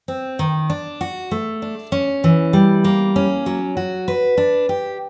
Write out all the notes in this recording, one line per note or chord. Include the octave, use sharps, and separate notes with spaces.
C4
D#3
D4
F#4
A3
D4
C#4
E3
G3
A#3
C#4
F#3
F#4
B4
D4
G4